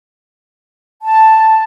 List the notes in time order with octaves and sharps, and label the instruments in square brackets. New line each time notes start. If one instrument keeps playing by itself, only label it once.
[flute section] A5